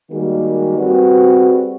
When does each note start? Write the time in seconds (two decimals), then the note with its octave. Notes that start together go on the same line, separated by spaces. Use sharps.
0.11 D#3 G3 G#3 A#3 F#4 G#4
0.77 G3 C4 F#4 G#4 B4